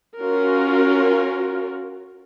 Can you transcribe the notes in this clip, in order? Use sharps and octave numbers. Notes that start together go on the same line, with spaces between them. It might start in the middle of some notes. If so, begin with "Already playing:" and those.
C#4 F4 F#4 A#4